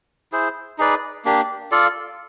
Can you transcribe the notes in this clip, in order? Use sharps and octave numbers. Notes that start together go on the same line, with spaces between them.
E4 G#4 C5
D#4 G#4 B4 D5
A#3 D4 G4
F4 A4 D5 F5